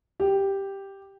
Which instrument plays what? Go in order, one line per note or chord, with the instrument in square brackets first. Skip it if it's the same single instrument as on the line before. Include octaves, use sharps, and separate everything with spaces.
[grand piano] G4